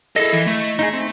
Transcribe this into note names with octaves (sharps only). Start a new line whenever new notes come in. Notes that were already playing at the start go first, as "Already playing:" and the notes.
E4 G#4 A4 D#5
E3 E5
A3
D#4 E4 G#4
C4